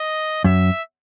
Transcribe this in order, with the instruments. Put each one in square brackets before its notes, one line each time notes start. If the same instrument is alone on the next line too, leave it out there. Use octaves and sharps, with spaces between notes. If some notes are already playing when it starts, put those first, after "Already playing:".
Already playing: [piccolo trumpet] D#5
[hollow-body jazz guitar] F#2 [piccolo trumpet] E5